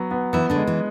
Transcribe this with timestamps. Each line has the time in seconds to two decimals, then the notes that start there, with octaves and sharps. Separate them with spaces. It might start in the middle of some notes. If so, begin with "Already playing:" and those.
Already playing: F#3 B3
0.11 B3
0.33 E3 B3 E4
0.50 D3 D4
0.56 G#3
0.67 E3